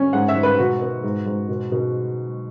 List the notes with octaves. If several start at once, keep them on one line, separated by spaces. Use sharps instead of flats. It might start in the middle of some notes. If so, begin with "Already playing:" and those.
Already playing: C#4
G#2 F#5
E5
G#2
B4
B2 F#4
B3
G#2
G#2
B2
B2